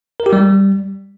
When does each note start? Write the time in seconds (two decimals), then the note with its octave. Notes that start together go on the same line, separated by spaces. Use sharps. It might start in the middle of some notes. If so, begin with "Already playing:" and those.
0.20 A#4
0.26 G4
0.33 G3